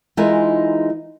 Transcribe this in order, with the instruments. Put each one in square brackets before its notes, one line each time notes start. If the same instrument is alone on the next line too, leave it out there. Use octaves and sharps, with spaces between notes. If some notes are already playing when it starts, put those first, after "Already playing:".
[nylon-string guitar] E3 G#3 D#4 F4 A#4 G#5